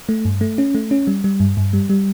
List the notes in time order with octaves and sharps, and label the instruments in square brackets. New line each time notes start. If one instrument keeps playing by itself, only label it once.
[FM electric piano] A3
G2
A3
C#4
A3
C#4
G3
G3
G2
G2
G3
G3